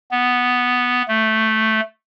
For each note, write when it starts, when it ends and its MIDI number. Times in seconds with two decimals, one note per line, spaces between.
0.11 1.02 59
1.08 1.80 57